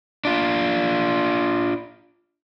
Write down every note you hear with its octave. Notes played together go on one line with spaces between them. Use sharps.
D4 F4